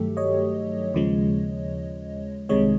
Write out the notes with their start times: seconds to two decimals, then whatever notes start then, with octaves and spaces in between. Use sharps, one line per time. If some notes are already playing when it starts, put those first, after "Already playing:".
Already playing: G2 D#3 F#3 A3 G4 A4
0.17 C#5 D#5
0.94 D#2 C#3 F3 G#3
2.49 C2 C3 D#3 G#3 C#5 D#5